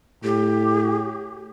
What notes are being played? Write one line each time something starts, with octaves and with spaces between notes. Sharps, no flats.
A2 G4